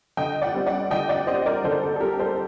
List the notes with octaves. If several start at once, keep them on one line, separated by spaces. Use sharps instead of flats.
D3 D#5 G5
D5 F#5
G3 C4
D5 F#5
D3 D#5 G5
D5 F#5
G3 C4 C5 D#5
A#4 D5
D3 A4 C5
A4
A4
G3 C4 G4 A#4
A4 C5